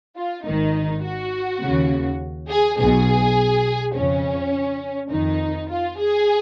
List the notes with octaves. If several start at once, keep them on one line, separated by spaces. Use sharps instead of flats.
F4
G#1 G#2 D#3 D#4
F#4
D#2 C#3
G#4
B1 B2 G#4
F2 C#3 C#4
F2 D#3 D#4
F4
G#4